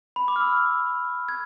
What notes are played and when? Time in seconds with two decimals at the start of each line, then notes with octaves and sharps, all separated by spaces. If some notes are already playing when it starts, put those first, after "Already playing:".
0.16 B5
0.28 D6
0.36 F6
0.41 E6
1.29 G#6